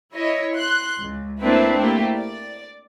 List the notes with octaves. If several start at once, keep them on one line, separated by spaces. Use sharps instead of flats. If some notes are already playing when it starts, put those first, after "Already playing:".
E4 C#5 D#5
C6 F#6
C#2
A3 A#3 C4 D4 E4 B4
A3 A#3 E4 G4
D5